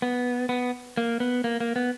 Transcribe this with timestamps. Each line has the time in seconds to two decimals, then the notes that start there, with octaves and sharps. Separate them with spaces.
0.02 B3
0.49 B3
0.97 A#3
1.20 B3
1.44 A#3
1.60 A#3
1.76 B3